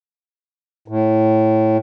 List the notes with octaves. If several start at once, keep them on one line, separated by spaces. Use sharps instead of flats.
A2